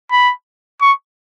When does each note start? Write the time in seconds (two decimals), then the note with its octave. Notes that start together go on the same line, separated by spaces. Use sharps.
0.11 B5
0.82 C#6